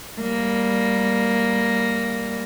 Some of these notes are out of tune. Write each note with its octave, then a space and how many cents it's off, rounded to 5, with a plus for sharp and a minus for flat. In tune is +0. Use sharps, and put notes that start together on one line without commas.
G3 +0 A#3 +0